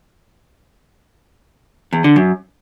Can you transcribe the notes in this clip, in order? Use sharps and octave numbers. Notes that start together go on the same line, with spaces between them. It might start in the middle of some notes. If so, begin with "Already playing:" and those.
E2
D3
F#2